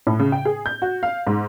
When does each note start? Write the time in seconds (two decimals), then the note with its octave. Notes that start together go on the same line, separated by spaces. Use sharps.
0.07 A2
0.19 C#3
0.32 G5
0.45 G#4
0.66 G6
0.82 F#4
1.03 F5
1.27 G#2